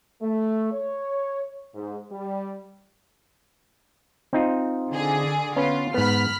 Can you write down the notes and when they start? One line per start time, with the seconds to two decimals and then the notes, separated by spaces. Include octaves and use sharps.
0.22 A3
0.73 C#5
1.75 G#2
2.11 G3
4.33 C4 D#4 F4
4.90 D3 G#4
5.56 B3 C#4 F4 B4
5.94 G#2 B3 B5 F6 B6